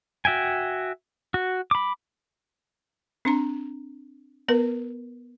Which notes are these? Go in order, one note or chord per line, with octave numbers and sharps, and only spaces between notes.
F#4 E5 G5 G#5
F#4
B5 D6
C4 D4 A#5
B3 A#4 B4